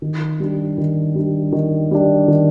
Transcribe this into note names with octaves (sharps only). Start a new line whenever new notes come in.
D#3
G3 D4
D#3
G3 D4
D#3
G3 D4
D#3